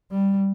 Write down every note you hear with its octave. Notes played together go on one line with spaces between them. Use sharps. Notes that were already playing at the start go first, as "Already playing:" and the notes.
G3